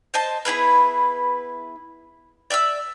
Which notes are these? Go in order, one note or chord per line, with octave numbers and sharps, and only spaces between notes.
C5 D#5 A5
B3 E4 G#4 B4
D5 E5 D6 E6